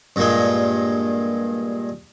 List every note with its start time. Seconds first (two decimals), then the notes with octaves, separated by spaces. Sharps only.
0.16 G2 A#2 G#3